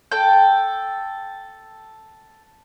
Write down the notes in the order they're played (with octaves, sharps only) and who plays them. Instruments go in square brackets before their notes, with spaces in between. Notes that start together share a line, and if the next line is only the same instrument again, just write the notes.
[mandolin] A4 G5